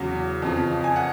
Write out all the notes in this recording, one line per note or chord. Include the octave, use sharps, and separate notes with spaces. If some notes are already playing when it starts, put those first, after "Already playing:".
Already playing: E2 C#3 F#3
F2 C#3 F3
G#5
F#5